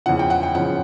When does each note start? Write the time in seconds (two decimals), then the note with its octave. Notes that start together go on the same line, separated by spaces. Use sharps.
0.06 E2 C#3 F3 F#5
0.19 G5
0.30 F#5
0.43 G5
0.55 E2 C#3 F3 F#5